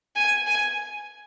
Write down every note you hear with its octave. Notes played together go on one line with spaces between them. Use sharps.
G#5
G#5